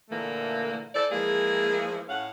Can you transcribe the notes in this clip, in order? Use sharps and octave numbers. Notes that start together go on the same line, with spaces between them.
A#2 D3 E3 A3 A#3
E3 A4 C5 D5
E3 F3 G#3 A#3 G#4
A2 C#4 F5 F#5